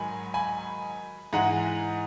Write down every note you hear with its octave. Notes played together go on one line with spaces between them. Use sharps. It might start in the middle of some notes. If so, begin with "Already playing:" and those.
Already playing: G#2 D#3 F#3 G#5 B5
G#5 B5
G#2 E3 G#3 F#5 A#5